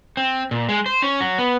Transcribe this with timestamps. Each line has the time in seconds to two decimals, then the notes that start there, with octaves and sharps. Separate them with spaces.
0.17 C4
0.51 A#2
0.69 G#3
0.86 C5
1.02 C#4
1.21 F#3
1.38 B3